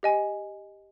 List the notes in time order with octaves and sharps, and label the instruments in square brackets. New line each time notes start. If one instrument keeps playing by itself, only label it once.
[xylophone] G4 D#5 G#5